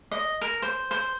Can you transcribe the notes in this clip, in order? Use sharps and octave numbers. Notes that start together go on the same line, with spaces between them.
D#5
A#4
C5
C5